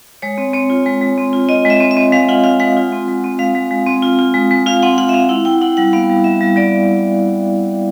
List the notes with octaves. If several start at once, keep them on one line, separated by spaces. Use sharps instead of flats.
G#3 C#5
C4
C4 C#5
F4
G#3
G#3
C4
F4
F4 D#5
G#3 E5
C4
E5
C4
G#3 F5
F4 F#5
F4 F5
G#3 F#5
F4
C4
G#3
C4
G#3 F5
G#3
G#3
C4
F4
F4
G#3
G#3
F4 F5
C4 F#5
F4 F#5
E5
C4 F5
E4 F#5
E4 G5
E4 F#5
G3 F#5
B3 F5
G3
G3 E5
G3
G3 D5